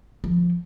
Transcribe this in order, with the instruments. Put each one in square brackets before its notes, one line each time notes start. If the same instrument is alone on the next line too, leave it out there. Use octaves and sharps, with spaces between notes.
[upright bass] F3